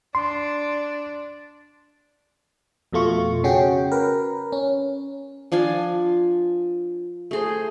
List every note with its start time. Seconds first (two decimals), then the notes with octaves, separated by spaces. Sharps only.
0.15 D4 C6
2.93 F2 B2 A3 F4 C#6
3.44 C#3 C#4 F#4 G#4 G5
3.92 A#4 B4
4.52 C#4
5.52 F3 D4 F4 G#5
7.31 A3 G#4 C5